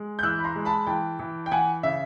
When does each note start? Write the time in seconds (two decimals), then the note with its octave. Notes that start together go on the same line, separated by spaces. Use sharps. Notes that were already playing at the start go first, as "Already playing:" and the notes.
Already playing: G#3
0.19 G6
0.23 E3 E6 F#6
0.39 B5
0.44 A#5 C6
0.55 G#3
0.65 A5 B5
0.87 E3 G5 A5
1.19 E3
1.46 G5
1.52 E3 F#5 G#5
1.83 C#3 E5